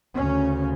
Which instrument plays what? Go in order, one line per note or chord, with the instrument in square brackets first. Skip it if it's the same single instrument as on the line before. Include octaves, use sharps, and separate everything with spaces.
[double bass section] D2 C#3 C#4